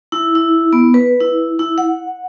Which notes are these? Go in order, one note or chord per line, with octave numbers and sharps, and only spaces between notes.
E4
E4
B3
B4
E4
E4
F#5